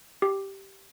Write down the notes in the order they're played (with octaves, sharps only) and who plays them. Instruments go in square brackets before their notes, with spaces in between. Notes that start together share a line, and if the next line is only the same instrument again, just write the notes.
[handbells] G4